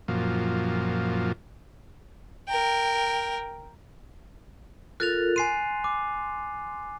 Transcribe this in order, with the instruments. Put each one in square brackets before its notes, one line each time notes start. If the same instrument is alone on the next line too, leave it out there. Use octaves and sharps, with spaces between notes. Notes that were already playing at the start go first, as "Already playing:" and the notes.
[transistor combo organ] F#2 A#2 F3
[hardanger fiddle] A#4 G5
[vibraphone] F4 A4 A#4 [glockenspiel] F#6 A6 F7
[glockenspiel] G#5 C7 D#7 [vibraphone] C6
[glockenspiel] D6